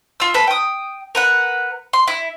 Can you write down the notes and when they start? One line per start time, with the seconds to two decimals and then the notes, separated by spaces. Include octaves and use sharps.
0.20 F4 E6
0.34 A4 B4 B5
0.47 G5 D#6
1.15 A#4 B4 F#5
1.93 C6
2.08 E4